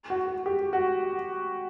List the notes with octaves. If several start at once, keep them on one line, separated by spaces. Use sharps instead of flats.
F#4
F#4
G4
F#4